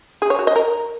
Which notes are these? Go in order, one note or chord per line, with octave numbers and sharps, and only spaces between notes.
G#4
C#5
F#4
D#5
A#4